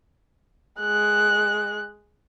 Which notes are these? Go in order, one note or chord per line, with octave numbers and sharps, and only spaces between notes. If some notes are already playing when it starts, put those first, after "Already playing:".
G#3 F#6